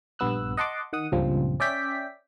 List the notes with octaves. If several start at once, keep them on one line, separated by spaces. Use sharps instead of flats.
A#1 G2 B3 E6 F#6
D#5 F#5 A5 C6 D6
D#3 F#5 D#6
C#2 G2 A#2 C#3 F3 C4
C#4 D5 E5 G5 B6